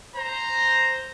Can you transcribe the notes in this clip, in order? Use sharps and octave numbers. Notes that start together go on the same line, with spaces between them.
C5 A#5